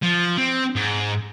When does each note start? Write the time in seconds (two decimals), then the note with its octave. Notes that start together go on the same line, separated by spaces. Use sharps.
0.03 F3
0.38 C4
0.76 G#2